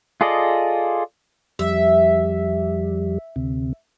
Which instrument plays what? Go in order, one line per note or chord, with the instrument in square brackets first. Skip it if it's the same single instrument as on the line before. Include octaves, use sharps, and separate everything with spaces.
[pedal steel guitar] F4 G#4 A4 D5 D#5
[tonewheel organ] F2 G3 [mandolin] E5
[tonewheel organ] D2 C3